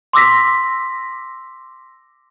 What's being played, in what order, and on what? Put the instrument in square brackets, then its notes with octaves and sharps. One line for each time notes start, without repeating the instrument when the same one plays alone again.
[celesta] C6 D6 E6 A#6 B6